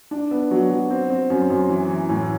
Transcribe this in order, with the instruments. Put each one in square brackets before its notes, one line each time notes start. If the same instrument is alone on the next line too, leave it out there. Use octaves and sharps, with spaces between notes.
[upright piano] D4
B3
F#3
F#3
C4
C4
F#2
F#2
E3
E3
A2